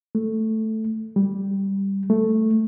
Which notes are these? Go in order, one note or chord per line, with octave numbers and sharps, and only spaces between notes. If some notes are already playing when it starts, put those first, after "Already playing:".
A3
G3
A3